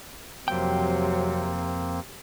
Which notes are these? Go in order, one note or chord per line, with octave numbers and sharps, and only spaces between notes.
F2 C3 F#3 A#3 C4 G5